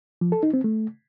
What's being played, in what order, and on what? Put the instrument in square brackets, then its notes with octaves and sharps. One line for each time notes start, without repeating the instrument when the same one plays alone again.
[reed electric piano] F3
A4
D#4
C4
A3